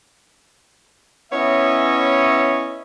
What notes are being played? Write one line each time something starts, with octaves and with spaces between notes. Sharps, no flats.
B3 C#4 E4 C#5 D#5 E5